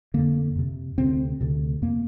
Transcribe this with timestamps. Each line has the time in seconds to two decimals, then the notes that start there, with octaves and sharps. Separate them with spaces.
0.14 F2 D3 A#3
0.55 F2 C3
0.98 D2 C3 C4
1.41 D2 C3
1.82 F2 C3 A#3